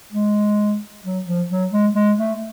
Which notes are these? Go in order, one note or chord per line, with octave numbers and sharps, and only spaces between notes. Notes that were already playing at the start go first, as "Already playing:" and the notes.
G#3
F#3
F3
F#3
G#3
G#3
A3